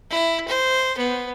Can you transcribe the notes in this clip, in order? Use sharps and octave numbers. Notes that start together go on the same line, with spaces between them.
E4
C5
B3